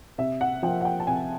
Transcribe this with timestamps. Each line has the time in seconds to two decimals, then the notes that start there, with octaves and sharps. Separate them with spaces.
0.18 C3 E5
0.41 F#5
0.63 F3 A#3 G5
0.81 F#5
0.85 G5
1.00 A5
1.07 C3 G#5